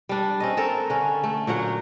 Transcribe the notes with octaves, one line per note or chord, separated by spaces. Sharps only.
G3 D4
C4 C#4 D#5
C4 A4 A#4
D3 C#4
A3
A#2 F#3 C#5 F#5